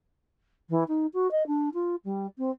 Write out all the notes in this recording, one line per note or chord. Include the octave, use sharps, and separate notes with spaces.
E3
D#4
F#4
D#5
D4
F4
G3
C4